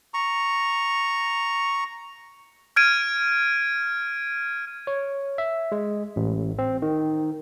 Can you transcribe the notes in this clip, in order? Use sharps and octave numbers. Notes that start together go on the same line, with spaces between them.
A#5 C#6
F6 G#6 D7 D#7
C#5
E5
G#3
A1
C4
D#3